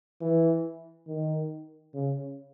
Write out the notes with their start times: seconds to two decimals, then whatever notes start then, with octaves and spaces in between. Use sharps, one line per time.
0.21 E3
1.08 D#3
1.94 C#3